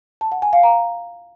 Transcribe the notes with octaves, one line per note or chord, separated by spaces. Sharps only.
A5
F#5
G#5
F5
A#5